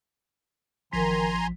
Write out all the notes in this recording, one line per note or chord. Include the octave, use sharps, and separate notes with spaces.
A1 D#3 F3 G#5 A#5 C6 B6